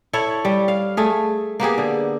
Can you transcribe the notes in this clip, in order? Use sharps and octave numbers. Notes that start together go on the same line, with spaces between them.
E4 A4 C#5
G3
F5
A3 G#4
A#3 B3 G4 G#4
D3